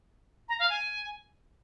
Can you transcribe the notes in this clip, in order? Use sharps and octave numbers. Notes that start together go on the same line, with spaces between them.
A#5
F5
G#5